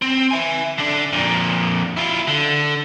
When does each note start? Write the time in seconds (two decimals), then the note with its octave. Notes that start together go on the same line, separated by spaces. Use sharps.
0.02 C4
0.31 E5 G#5
0.78 D3 D4
1.13 F2 A#2
1.97 E4 F4
2.27 D3